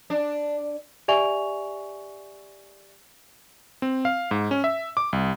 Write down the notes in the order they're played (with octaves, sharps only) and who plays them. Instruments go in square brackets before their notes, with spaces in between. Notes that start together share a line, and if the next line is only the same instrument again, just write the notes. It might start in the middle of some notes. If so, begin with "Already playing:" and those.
[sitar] D4
[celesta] G4 D5 E5 G#5 C#6 F7
[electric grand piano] C4
F5
G#2
C#4
E5
D6
C2